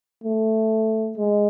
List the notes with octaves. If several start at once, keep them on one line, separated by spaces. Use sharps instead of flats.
A3
G#3